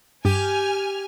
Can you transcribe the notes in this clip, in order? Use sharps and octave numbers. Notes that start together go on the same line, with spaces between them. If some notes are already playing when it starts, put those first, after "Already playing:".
G2 G4 G#5 F6